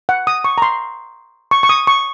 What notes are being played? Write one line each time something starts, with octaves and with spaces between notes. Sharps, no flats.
F#5
D#6
C#6
A#5
C6
C#6
C#6
D#6
C#6